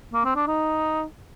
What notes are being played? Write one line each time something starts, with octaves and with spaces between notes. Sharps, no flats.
A#3
C4
D4
D#4